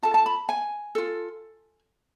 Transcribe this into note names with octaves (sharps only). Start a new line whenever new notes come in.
F4 A4 A5
A5
B5
G#5
F4 A4